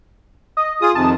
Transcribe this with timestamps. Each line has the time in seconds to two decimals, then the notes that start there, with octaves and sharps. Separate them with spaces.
0.57 D#5
0.82 F4 G#4 D#6
0.95 F2 C3 D#3 A5